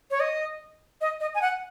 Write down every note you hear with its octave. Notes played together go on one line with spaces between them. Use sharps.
C#5
D#5
D#5
D#5
G#5
F#5